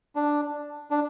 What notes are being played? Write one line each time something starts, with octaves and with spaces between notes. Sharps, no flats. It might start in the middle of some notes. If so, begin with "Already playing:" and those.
D4
D4